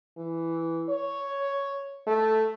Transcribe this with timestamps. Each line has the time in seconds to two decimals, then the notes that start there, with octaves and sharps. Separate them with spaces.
0.18 E3
0.89 C#5
2.07 A3